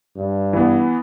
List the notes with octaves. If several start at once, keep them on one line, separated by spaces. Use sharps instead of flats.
G2
E3 B3